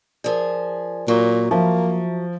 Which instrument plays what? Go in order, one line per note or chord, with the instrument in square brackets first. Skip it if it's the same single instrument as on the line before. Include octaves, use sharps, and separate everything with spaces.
[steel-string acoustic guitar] F3 G#4 [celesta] A#4 D5
[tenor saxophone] A#2 [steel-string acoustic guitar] F#3
[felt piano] F3 [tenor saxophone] A#3 [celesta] E5